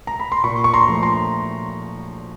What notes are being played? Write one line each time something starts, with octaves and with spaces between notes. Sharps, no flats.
A#5
B5
C6
A#2 B5 C#6
C#6
A#5 C6
F3 A3
A#5 C6